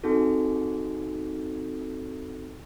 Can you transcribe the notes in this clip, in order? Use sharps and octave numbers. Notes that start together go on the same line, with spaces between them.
C4 D#4 F#4 G#4 A4